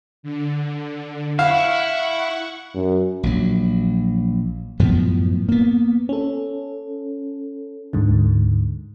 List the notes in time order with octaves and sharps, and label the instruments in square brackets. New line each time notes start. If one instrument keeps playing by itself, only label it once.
[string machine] D3
[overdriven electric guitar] E4 [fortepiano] F5 [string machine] F#5 C#6
[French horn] F#2
[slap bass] A#1 F#3
F#2 A2 F3 B3
A#3 B3
[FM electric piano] C#4 A4
D2 G#2 D3